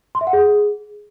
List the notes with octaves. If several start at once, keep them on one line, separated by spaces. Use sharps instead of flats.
C6
E5
F#5
G#4